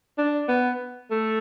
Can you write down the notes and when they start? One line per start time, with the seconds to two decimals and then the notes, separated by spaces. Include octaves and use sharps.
0.18 D4
0.49 B3
1.11 A3